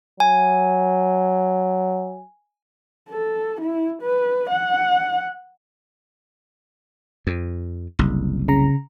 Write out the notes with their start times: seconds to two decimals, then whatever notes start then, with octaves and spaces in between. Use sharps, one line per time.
0.20 F#3 G#5
3.10 A4
3.61 E4
4.02 B4
4.50 F#5
7.27 F2
7.99 F#1 C2
8.48 C#3 A#5